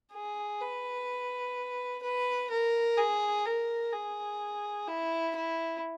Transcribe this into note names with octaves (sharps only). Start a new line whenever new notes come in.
G#4
B4
B4
A#4
G#4
A#4
G#4
E4
E4